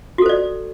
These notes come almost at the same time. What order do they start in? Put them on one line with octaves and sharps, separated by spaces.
F#4 A4 C5 D5